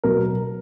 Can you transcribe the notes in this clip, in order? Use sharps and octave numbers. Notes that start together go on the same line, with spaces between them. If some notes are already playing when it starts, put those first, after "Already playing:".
B2 F#3 A#4